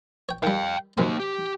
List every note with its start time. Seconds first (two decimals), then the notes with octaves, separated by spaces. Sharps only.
0.29 C#5 G5
0.43 D#3 G3 F5 G5
0.98 F#2 C3 A#3 D#4 C6
1.20 G4